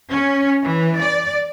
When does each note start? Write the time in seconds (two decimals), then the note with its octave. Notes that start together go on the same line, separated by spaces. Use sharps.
0.10 C#4
0.64 E3
1.00 D5